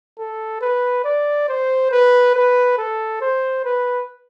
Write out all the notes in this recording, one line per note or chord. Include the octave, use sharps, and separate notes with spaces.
A4
B4
D5
C5
B4
B4
A4
C5
B4